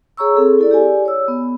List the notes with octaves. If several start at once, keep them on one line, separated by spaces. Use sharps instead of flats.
G#4 C#5 A#5 C#6 E6
C4 G#4 A4
E4 A4 D5
G4 D5 G#5
C#5 E6
B3